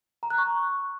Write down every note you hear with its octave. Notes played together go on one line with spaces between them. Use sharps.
A#5
F#6
C#6